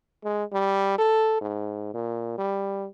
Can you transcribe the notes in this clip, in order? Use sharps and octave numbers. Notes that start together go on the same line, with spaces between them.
G#3
G3
A4
G#2
A#2
G3